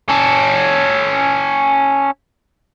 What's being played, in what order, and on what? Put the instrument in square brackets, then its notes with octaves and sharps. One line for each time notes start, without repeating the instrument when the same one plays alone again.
[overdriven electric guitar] C#4 A4